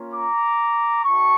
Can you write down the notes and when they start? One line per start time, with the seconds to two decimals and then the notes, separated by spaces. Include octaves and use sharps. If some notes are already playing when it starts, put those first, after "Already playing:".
Already playing: A#3 C#4 F4
0.14 A#5 D6
1.04 E4 G4 A5 C#6